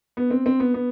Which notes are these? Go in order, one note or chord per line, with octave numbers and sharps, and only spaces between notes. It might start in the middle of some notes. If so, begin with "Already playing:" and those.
B3
C4
C4
B3
B3